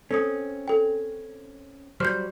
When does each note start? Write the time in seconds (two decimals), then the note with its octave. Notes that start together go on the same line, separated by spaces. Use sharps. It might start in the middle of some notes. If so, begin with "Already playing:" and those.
0.11 C4 C#4 A4 D#6
0.68 A4 G5
2.00 F#3 G3 C5 F6 G6